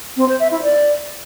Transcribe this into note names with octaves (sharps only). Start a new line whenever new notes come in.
C4
C5
E5
E4
D5